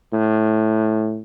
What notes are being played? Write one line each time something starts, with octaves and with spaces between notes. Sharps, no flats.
A2